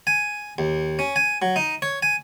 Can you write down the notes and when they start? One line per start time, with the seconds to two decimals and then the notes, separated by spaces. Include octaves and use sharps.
0.07 G#5
0.58 D#2
0.99 C#4
1.16 G#5
1.42 F#3
1.56 D#4
1.82 C#5
2.02 G#5